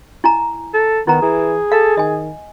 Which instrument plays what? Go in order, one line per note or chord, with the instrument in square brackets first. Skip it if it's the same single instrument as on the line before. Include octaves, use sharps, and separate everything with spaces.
[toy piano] E4 G#5 A#5
[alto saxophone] A4
[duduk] D#3 [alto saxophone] B3 [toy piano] E4 A#5
[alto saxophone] E3 [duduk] G#4
[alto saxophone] A4 [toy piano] F5
[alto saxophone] D#3 [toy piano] D#5 G#5